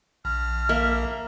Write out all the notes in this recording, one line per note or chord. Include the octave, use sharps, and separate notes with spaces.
A#1 F6
A#3 E5